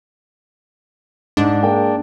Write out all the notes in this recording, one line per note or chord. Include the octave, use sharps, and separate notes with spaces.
G#2 D4
G#3 A#3 G5